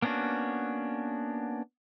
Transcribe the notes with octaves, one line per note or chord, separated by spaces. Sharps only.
A#3 B3 C#4 D4 F#4